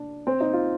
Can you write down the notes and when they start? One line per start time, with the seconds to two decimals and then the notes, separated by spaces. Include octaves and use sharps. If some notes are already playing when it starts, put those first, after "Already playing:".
Already playing: D4
0.27 C4
0.40 D#4
0.53 F4